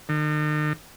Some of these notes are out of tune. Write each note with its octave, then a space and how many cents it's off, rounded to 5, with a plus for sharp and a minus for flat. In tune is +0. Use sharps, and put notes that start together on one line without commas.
D#3 -45